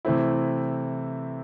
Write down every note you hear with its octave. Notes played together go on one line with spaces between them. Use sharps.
C3 E3 A3 C4 E4